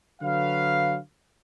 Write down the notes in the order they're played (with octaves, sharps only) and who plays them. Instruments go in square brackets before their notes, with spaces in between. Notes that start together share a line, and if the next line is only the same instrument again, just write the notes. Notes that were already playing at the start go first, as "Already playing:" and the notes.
[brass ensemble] D3 F#3 B4 F5